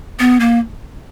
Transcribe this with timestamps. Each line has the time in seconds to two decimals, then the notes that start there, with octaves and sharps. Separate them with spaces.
0.19 B3
0.40 A#3